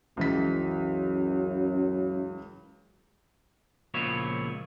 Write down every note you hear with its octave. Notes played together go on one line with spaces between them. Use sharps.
C#2 F#2 E3 B6
C#2 A#2 F3 B3 E4 C#5